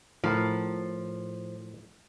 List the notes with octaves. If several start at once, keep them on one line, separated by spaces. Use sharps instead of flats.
A2 F3 A#4